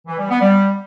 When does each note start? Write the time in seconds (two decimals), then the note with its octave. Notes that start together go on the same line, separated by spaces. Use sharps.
0.07 E3
0.18 G3
0.30 B3
0.41 G3